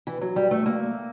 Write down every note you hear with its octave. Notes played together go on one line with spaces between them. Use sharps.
E3
F#3
G3
A3
A#3